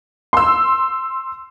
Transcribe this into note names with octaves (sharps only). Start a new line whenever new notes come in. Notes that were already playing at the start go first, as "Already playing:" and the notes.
C6 E6